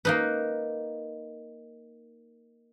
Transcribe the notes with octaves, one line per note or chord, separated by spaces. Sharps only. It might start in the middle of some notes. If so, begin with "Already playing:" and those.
A#3 D#4 B4